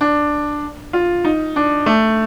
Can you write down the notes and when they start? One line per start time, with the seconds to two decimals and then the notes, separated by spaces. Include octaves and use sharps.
0.01 D4
0.93 F4
1.24 D#4
1.56 D4
1.86 A3